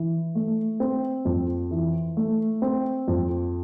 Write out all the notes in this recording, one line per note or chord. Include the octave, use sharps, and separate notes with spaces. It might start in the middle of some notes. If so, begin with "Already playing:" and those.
Already playing: E3
A3
C4
F2
E3
A3
C4
F2